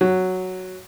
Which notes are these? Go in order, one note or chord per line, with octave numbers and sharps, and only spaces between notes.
F#3